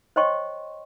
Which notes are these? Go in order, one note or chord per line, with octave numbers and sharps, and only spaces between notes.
C5 C#5 D#5 G5 C6 C#6